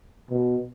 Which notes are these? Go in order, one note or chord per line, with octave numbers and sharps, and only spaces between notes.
B2